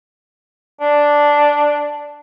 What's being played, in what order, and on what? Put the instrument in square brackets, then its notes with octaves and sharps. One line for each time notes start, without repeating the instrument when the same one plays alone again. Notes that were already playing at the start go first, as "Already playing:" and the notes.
[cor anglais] D4